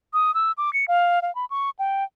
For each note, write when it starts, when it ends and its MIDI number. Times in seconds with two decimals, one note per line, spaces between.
0.13 0.34 87
0.34 0.52 88
0.58 0.73 86
0.73 0.85 97
0.88 1.20 77
1.22 1.33 77
1.35 1.45 83
1.50 1.70 85
1.79 2.04 79